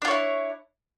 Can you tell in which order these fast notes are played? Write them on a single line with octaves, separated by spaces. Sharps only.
D4 F4 C#5 E4